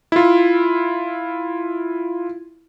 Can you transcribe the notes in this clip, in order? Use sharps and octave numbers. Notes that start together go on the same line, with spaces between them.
E4 F4